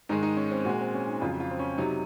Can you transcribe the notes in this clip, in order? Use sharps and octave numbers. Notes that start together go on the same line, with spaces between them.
G#2 D#3 G#3 D#4
D#4
C#4
C4
A#2 G#3 F#4
C4
C#4
D#4
F2 C#3 F#3 F4
F4
C4
C#4
C3 F#3 D#4